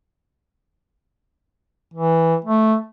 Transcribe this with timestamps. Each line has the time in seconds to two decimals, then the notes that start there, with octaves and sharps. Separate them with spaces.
1.94 E3
2.44 A3